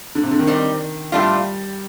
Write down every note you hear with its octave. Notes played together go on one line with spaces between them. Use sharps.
D3
C3
D3
D#3
G3 C4 D#4
A2 G3 A3 D4 F4